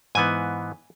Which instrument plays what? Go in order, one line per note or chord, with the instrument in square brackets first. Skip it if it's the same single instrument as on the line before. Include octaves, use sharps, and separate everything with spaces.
[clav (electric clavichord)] G#2 E3 B3 G#5